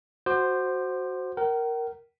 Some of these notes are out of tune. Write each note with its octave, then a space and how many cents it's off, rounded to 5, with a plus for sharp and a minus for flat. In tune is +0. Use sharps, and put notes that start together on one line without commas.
F#4 +0 C5 +0 D6 +35
A#4 +0 G5 -45